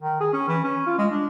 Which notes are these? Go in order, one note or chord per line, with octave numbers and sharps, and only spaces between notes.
D#3
G#4
C#4
E3
C#4
F4
G#3
D4